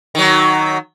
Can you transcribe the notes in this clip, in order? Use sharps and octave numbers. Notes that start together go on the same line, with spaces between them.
D#3 F#3